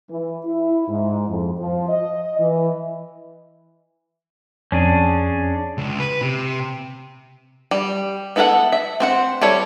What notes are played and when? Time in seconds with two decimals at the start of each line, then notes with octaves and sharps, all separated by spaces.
0.10 E3
0.45 E4
0.88 G#2
1.28 F2
1.59 F3
1.89 D#5
2.39 E3
4.72 F2 C#4 D4 G#4
5.78 C#2
6.00 B4
6.21 C3
7.71 G3
8.36 B3 E4 A4 A#4 F#5
8.72 E5
9.00 C4 C5 F#5
9.41 G3 E4 A4 C#5